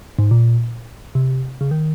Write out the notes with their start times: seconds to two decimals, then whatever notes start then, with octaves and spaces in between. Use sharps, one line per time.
0.19 G#2
0.31 A#2
1.15 C3
1.61 C#3
1.71 D#3